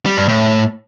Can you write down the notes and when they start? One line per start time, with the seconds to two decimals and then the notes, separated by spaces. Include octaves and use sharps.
0.06 G3
0.17 G2
0.29 A2